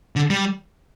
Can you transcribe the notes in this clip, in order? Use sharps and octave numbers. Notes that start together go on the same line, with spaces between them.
D3
G3